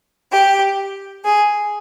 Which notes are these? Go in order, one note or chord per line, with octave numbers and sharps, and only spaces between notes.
G4
G#4